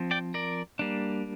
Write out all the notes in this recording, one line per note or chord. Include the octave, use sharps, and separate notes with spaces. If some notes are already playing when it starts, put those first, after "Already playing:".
Already playing: F3 C4
D5 G5
A#4 D5
G3 A#3 D4